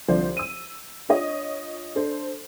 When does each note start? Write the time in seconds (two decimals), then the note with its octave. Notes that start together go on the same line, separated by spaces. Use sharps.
0.08 C2 D3 F3 C5 D5
0.37 E6 D#7
1.09 D4 F4 C#5 D#5
1.95 D4 A4 C5